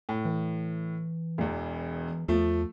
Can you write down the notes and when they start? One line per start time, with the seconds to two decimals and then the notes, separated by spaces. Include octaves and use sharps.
0.09 A2
0.25 E3
1.38 E1 E2
2.28 E2 F3 A3